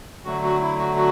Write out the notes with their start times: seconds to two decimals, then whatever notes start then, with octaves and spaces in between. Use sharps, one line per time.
0.25 D3 F#3 A3 F#4
0.43 F#4
0.61 E4
0.78 F#4
0.96 F#4